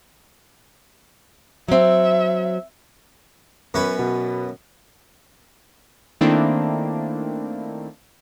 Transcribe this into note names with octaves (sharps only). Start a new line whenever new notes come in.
F#3 C4 E5
F#2 B3 C#4 B4 B5
B2
D#3 A3 A#3 C4 D4 E4